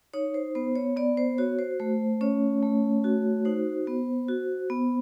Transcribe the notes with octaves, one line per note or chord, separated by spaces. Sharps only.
D#4 C#5
C5
B3 C5
C#5
B3 D5
C5
F#4 C#5
C5
A3 C5
C#4 C#5
A3
F#4
D#4 C5
B3
F#4
B3